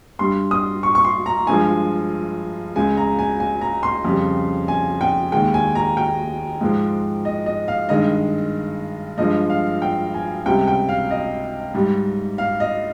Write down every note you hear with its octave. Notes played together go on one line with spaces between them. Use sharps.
G2 G3 C6
D#6
C#6
C#6
C6
A#5
G2 F3 G#3 G#5
C#2 C#3 G#3 G#5
A#5
G#5
G#5
A#5
C6
F2 C#3 G3
G#5
G5
D#2 D#3 G#3 G5
G#5
A#5
G5
G#2 F3 G#3
D#5
D#5
F5
G2 D#3 G#3 D#5
G2 F3 G#3 D#5
F5
G5
G#5
C#2 C3 G3 G5
G5
F5
D#5
G#2 G3
F5
D#5